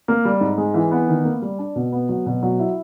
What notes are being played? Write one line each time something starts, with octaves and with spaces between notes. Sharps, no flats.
A#3
G3
G#2
G#3
E3
B3
D#3
A#3
G3
D4
B2
B3
F#3
B2
F#3
E4